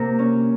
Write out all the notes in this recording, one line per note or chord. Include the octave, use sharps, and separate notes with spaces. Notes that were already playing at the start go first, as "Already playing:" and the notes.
Already playing: C3 A#3 A#5
C#4